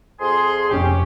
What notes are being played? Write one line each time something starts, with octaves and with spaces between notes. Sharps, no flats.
F2 G#4 C6
F1 C#4 G4